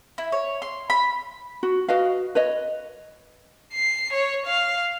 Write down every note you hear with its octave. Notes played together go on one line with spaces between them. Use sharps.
E4
C#5
C6
B5
F#4
F#4 B4 D#5 F5
B4 C#5 D#5
C7
C#5
F5